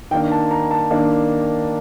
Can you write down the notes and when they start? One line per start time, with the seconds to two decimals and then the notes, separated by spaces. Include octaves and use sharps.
0.11 D#3 A#3 D4 G5
0.32 A5
0.51 A#5
0.71 A5
0.91 D#3 A#3 D4